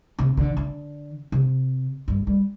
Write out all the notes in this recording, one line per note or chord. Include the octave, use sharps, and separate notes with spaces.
C3
D3
D3
C3
G2
G3